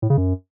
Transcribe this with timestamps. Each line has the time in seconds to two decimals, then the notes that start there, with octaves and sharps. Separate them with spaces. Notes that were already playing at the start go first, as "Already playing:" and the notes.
0.02 A2
0.10 C#3
0.17 F#2